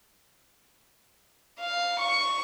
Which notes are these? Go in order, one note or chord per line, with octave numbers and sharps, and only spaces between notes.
F5
C#6